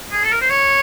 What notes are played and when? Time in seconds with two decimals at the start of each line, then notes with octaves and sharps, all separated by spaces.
0.12 G#4
0.23 A4
0.32 A#4
0.41 C5
0.50 C#5